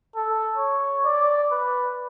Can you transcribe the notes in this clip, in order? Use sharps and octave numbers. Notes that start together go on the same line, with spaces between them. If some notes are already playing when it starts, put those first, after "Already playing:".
A4
C#5
D5
B4